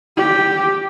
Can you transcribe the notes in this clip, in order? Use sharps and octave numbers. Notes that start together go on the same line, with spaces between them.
G4